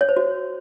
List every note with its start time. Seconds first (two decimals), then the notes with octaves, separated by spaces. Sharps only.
0.01 C#5
0.09 C5
0.17 F#4